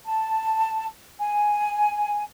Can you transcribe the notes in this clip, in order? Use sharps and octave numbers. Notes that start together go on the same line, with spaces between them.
A5
G#5